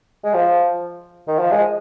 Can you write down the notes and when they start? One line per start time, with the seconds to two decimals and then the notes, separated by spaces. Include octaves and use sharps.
0.24 G#3
0.34 F3
1.28 D#3
1.39 F3
1.51 G#3